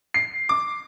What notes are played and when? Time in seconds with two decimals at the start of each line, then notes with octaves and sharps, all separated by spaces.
0.14 C7
0.49 D6